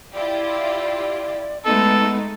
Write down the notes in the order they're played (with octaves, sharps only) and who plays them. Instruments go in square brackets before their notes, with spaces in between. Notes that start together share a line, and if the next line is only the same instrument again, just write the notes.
[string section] E4 F4 G4 [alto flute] D5
[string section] G#3 A3 D#4 [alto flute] B3 [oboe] A4